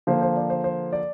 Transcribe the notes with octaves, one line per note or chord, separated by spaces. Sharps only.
D3 F3 A#3 C5
C5
D5
C5
C5
D5